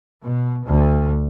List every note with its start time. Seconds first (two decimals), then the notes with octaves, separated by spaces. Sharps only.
0.23 B2
0.65 D2